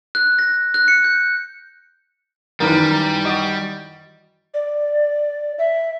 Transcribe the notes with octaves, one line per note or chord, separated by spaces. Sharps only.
F#6
A#6
F#6
C#7
G6
F#2 D#3 E3 G3 A#4 B4
A#5
F#4 D#5 D6
D5
E5